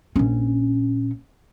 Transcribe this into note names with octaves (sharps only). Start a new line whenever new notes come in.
A#1 C#4